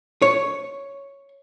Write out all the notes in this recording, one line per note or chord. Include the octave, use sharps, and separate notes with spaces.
C#5